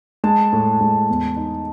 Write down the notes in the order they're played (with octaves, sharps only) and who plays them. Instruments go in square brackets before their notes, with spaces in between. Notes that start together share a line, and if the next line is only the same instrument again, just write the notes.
[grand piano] G#3 [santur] A5
[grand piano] A2
G#3
E2
D#4